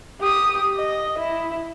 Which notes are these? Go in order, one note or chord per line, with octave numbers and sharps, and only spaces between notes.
G4 D#6
D#5
E4